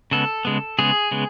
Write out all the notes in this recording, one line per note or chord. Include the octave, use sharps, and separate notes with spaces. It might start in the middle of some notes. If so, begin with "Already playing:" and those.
C#3 G#3 B3 A4
C#3 G#3 B3
C#3 G#3 B3 G#4
C#3 G#3 B3